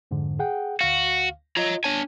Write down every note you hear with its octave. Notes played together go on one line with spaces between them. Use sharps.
F2 G#2 D3
G#4 F#5 G5
D2 F#4 F5
F4 C#5 D#5 A#5
D4 C#5 G#5 A5